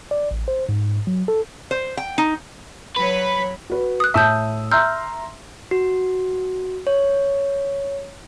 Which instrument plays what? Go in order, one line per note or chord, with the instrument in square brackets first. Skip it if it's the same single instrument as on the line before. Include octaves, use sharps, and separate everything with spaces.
[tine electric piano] D5
A1
C5
G#2
F#3
A4
[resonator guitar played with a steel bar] C5
G5
D#4
[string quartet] F#3 C#5 B5 [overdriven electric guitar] B4
[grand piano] F#4 B4
[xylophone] D#6 F#6
[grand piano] A2 D#6 E6 [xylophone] E5 A5 G6
[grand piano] E5 A#5 C6 [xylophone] E6 F6 G6
[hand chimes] F#4
C#5